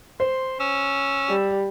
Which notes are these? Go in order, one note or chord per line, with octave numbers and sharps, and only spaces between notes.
C5 C6
C#4 E6
G3